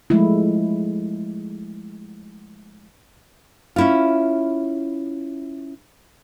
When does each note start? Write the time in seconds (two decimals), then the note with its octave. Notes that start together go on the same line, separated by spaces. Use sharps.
0.10 F3 G#3 A3 E4
3.76 C#4 E4 F4